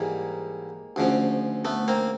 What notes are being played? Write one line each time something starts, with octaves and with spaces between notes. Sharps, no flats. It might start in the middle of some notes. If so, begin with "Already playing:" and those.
Already playing: G#2 E3 G3 G#3 A#3
D2 C#3 F3
A3 B3
A#3 C4